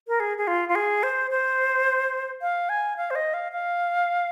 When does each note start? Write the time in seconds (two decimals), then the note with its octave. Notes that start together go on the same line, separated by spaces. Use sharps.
0.08 A#4
0.20 G#4
0.38 G#4
0.47 F4
0.69 F4
0.75 G#4
1.03 C5
1.31 C5
2.42 F5
2.69 G#5
2.97 F5
3.11 C5
3.15 D#5
3.34 F5
3.52 F5